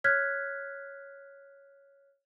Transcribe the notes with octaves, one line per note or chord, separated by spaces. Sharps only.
C#5 F6 F#6 G#6 B6